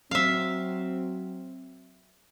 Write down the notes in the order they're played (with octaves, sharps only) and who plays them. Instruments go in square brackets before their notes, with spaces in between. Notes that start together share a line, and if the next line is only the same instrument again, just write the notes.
[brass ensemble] F#3 C4 [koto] E5 F5